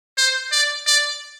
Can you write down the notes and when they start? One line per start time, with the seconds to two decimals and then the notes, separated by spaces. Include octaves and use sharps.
0.17 C5
0.52 D5
0.87 D5